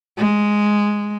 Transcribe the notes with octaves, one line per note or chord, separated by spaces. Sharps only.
G#3